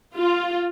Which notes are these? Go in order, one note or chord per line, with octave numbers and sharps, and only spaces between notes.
F4